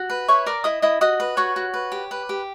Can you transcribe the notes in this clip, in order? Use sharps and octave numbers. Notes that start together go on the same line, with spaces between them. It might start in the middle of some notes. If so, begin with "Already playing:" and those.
Already playing: F#4
B4
E4 C#5 C#6
A#4 D5 D6
E4 D#5 D#6
E4 D#5 D#6
F#4 D#5 D#6
B4
F#4 C#5 C#6
F#4
B4
G4
B4
G4